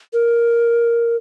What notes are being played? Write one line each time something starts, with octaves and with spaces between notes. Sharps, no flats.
A#4